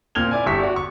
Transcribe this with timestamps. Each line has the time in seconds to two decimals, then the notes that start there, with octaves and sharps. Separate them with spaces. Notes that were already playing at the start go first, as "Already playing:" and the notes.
0.15 A#2 C4 F6 G#6 F7 G7
0.31 E4 D5 G#5
0.46 G1 G4 E5 C#6 B6
0.61 F#4 D5
0.76 C#6